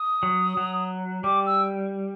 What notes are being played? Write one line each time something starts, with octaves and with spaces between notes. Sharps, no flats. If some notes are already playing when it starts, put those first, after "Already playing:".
Already playing: D#6
F#3
F#3
G3 D6
E6